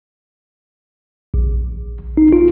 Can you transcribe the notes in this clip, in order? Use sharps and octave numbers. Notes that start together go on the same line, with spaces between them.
A#1
D#4
F4